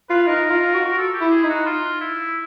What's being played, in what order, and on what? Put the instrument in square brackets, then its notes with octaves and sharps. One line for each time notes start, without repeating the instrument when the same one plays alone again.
[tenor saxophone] F4 [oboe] B4
[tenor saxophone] D#4 [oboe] A#4
[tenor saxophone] F4
F#4
[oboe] A4
G4
[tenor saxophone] E4
[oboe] G#4
[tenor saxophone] D#4
[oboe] F#4
F4
E4